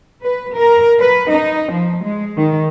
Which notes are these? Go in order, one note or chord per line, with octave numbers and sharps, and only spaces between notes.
B4
A#4
B4
D#4
F3
G#3
D#3